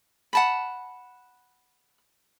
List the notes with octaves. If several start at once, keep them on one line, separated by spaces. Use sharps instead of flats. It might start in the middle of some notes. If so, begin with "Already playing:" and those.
F#5 A5 B5